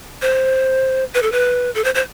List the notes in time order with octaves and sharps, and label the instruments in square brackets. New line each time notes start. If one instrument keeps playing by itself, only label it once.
[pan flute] C5
B4
A4
B4
A4
C5
C5